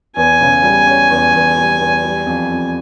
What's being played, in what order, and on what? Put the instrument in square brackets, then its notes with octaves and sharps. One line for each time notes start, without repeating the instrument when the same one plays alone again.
[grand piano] E2 [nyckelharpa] G#5
[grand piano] C#3
G3
C#4
E2
E2
G3
E2
G3
F2
F2